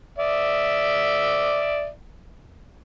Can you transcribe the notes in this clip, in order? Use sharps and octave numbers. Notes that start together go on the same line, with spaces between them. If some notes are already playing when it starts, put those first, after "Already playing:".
D5 E5